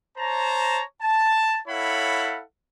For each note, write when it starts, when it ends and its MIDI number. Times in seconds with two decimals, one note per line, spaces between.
0.18 0.83 72
0.18 0.83 73
0.18 0.83 81
0.18 0.83 82
1.02 1.59 81
1.68 2.41 64
1.68 2.41 69
1.68 2.41 73
1.68 2.41 77
1.68 2.41 78
1.68 2.41 83